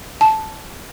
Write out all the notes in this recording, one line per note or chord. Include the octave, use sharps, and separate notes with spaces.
A5